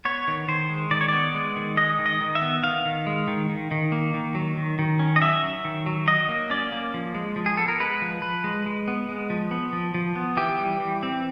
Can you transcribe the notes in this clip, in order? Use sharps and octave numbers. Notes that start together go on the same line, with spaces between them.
B3 C#5
D#3
D#3 C5
G#3
D#3 D5
C#5
B3 D5
G#3
D#3
G#3 D#5
D#3
D#5
D#3
E5
B3
D#3 F5
D#3
G#3
D#3
D#3
D#3
A#3
D#3
F#3
D#3
D#3
C#4
D#5
F#3 E5
F#3
D#3
F#3
F#3 D#5
A#3
C#4 D5
A#3
F3
G#3
F3
G#4
B3 A4
A#4
G#3 B4
F3
F3 B4
G#3
G#3
B3
G#3
F3
B3
F3
F3
B3
E3 G4
G3
E3
C4